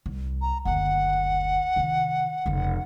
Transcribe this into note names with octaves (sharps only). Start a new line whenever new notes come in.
C2
A#5
F#1 D2 F#5
C3 D#3
F1 C#3